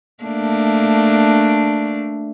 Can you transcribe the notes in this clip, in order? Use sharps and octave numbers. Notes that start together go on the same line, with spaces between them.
A3 A#3 D4